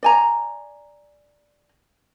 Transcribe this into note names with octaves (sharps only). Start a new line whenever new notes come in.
D5 G#5 A#5